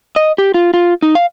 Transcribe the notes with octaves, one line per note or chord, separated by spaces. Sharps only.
D#5
G4
F4
F4
D#4
F5